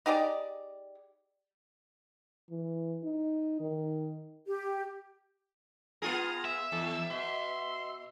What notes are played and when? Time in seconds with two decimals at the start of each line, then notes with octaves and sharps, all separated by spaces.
0.06 D#4 G4 G#4 D5
2.51 E3
3.04 D#4
3.60 D#3
4.47 G4
6.02 B3 F4 G#4 A#5
6.45 E5
6.72 E2 A4
7.10 B2 C6